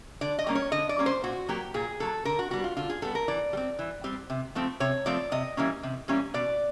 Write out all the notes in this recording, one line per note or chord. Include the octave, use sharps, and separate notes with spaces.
D3 D5
D#5
G3 A#3 C#4
C#5
D3 D#5
D5
G3 A#3 C#4
C5
A#2 F#4
F#3 A#3 G4
A#2 G#4
F#3 A#3 A4
D3 A#4
F#4
G3 B3 F#4
F4
D3 F4
G#4
G3 B3 A4
A#4
E3 D5
G3
C4
E3
G3 C4
C3
F3 A3 C4
C3 C#5
F3 A3 C4 D5
C3 D#5
E3 G3 A#3 C#4
C3
E3 G3 A#3 C#4
B2 D5